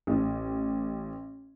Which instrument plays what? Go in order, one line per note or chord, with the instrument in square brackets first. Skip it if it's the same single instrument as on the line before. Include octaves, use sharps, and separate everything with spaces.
[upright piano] A1